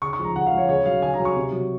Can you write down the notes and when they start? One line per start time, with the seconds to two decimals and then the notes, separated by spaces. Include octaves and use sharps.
0.02 C#3 C#6
0.13 C#6
0.19 F3 G#3 A#5
0.35 C#3 F#5
0.47 F5
0.53 F3 G#3 C#5
0.69 C#3 C#5
0.86 F#3 F5
1.02 C#3 G#5
1.14 A#5
1.19 F#3
1.25 C#6
1.36 C3
1.53 F#3